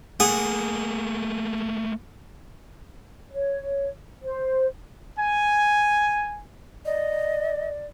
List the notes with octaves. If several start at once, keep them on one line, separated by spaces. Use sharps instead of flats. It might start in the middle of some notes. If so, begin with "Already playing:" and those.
A3 A#3 G#4 F#5
C#5
C5
G#5
D5 D#5